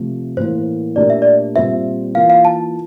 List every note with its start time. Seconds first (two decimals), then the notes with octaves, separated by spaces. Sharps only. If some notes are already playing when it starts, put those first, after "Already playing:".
Already playing: C3 F3 A3
0.37 A2 E3 A#3 C5
0.96 A#2 A3 D4 G4 A#4 D5
1.10 E5
1.22 D5
1.56 A#2 G3 C4 F4 C5 E5
2.14 E3 A#3 F4 A#4 F5
2.30 F5
2.45 A5